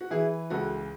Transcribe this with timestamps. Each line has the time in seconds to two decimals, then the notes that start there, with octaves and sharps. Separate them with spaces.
0.01 F#4
0.10 E3 E4 G#4
0.50 C#2 F#4 A4